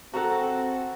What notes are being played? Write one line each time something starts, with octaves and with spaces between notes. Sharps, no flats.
C4 F#4 A4 F#5 A#5